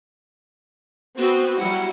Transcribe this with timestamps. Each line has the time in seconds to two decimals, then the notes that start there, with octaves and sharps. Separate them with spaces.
1.18 B3 C4 F#4
1.59 F#3 G3 E4 F#5